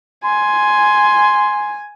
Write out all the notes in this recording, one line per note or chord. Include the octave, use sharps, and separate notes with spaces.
G#5 C6